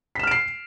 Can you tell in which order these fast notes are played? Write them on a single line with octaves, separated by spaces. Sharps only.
B6 E7 F6 D7 C7